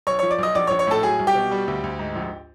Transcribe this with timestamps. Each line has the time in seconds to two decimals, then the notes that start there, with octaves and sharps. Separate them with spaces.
0.07 B1 C#5 C#6
0.19 F3 C#5 C#6
0.31 D5 D6
0.39 B1 D#5 D#6
0.55 A#1 D5 D6
0.67 C#5 C#6
0.71 A#1
0.79 C#5 C#6
0.87 A2 A4 A5
1.03 F#3 G#4 G#5
1.19 C2
1.27 G4 G5
1.35 B2
1.51 G3
1.68 D2
1.84 D2
1.99 G#2
2.15 A#1